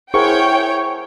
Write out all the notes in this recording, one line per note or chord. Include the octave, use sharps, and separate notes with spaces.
E4 G#4 A#4 C5 C#5 F#5 G5 C#6